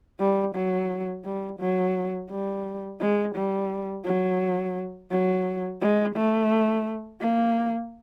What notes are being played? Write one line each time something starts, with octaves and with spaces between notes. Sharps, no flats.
G3
F#3
G3
F#3
G3
G#3
G3
F#3
F#3
G#3
A3
A#3